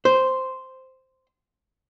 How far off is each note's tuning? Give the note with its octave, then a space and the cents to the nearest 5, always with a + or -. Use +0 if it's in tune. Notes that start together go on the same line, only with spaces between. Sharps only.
C5 -5